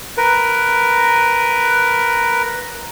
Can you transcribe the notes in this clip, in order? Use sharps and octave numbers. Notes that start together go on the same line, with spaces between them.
A#4 B4